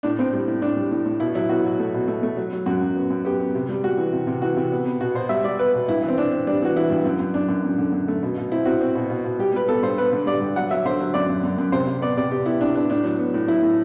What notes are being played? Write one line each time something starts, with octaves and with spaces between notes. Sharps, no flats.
A2 D4
A2 C4
G3
A2
A2 D4
G3
A2
A2
B2 E4
F#3 E4
B2 F#4
F#3
A3
B2
A3
A3
F#3
F#3
F#2 F#4
F#2
B3
F#2
B3 G4
B3
C3
G3
G3 F#4
E3
C3
C3
E3 F#4
C3
B3
B3
B2 F#4
B2 C5
G3 E5
G3 D5
B3 B4
B2
G2 E4
E3
C4
E3 D4
C4
G3 D4
E3 F#4
E3 E4
G2
F#2
F#2
F#2 D4
F#2
F#2
D3
F#2
A3
B2
B2
C4 E4
C4 F#4
C4
B2
B2
B2
G3 G4
G3 B4
B3 A4
G2 C5
B3 B4
D3
G3 D5
G2
F#3 F#5
F#3 E5
D3 C5
F#3
F#2 D5
F#2
F#2
F#2
C3 C5
C3
B3 D5
C3 D5
C3 G4
B3 E4
C3 D4
B3 D4
A2 D4
F#3
B3
A2
F#3 E4
A2